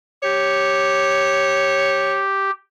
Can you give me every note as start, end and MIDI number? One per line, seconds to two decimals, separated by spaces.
0.23 2.51 67
0.23 2.21 73